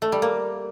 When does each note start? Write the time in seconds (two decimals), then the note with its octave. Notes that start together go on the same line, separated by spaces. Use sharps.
0.02 A3
0.12 G3
0.22 A#3